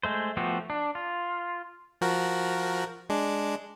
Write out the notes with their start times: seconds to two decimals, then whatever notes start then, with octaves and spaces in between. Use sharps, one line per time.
0.03 G#3 A3 C5
0.37 F3 A3 B3 F#4 G4
0.70 D4
0.95 F4
2.01 F3 F#4 A#4
3.09 G#3 D4